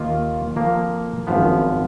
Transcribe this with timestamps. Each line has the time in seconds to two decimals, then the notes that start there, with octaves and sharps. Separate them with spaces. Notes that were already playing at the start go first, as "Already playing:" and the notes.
Already playing: D#2 D#3 A#3 F4
0.55 F2 F3 A#3
1.27 G#1 F#2 F3 B3